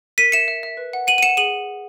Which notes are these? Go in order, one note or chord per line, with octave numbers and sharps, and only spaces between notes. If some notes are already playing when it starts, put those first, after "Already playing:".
A#4 B6 D#7
E5 C#7 E7
E5
E5
B4
F#5
F#5 D#7 F#7
D#7
F#5 C#7 E7
G#4 D#7 F#7